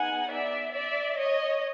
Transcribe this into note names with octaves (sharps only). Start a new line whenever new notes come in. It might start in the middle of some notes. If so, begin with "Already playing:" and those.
Already playing: B3 D#4 G#4 F#5 G#5
D5 E5
D5 E5
C#5 D#5